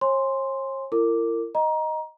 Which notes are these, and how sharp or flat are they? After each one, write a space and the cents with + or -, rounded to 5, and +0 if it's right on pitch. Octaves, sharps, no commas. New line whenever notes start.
C#5 -45 G#5 -10 C6 +0
E4 +40 A#4 -35 D6 +0
D#5 +0 A#5 +20